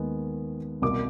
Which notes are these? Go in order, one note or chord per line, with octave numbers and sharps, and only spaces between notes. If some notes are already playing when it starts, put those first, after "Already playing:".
Already playing: D#2 D#3 G#3 B3
C2 B2 G3 A#3 D6